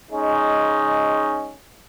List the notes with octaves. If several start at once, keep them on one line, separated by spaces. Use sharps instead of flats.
G#3 C#4 D#4